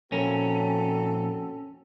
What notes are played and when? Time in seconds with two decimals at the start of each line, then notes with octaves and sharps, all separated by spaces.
0.12 F2 A#2 C4 C#4 F#4 A4 A#4